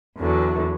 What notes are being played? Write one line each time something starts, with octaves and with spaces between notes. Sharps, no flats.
E2 D3 F#3